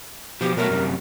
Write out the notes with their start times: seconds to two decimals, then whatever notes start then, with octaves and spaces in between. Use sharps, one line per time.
0.41 B2 F3 G4
0.56 B2 F#3 A3 A#4
0.69 F#2 C3 G3